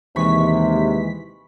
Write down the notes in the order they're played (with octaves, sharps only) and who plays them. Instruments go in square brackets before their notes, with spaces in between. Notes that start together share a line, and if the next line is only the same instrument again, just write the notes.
[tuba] D#2 [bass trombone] C3 [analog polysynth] E3 G#3 B6 [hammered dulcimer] B5 C#6